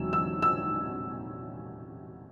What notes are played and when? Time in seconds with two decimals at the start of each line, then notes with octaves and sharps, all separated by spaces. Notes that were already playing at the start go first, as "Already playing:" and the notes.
Already playing: E1 C3 F#3 E6
0.13 E6
0.42 E6